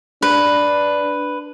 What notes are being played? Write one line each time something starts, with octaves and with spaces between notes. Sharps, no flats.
D4 B4